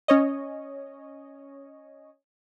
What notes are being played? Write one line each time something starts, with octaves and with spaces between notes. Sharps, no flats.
C#4 C#5 D#5